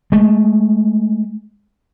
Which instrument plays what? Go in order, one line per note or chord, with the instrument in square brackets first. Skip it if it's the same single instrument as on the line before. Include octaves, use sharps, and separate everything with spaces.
[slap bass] G#3 A3